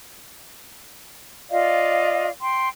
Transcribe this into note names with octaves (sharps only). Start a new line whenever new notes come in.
F4 D5 D#5 F5
G5 C6